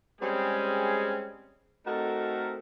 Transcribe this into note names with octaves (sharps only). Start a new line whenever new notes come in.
G3 G#3 C4 C#4 G#4
A3 C4 D#4 F#4 A4 A#4